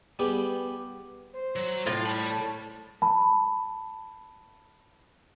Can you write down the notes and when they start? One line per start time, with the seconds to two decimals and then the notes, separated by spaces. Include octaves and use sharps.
0.19 G3 B3 G4 G#4
1.33 C5
1.56 F#3
1.86 A2 F4
2.06 D5 A5 B5
3.02 A5 B5